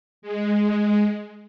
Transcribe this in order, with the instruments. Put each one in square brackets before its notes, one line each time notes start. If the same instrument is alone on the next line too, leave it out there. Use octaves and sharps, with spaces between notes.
[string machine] G#3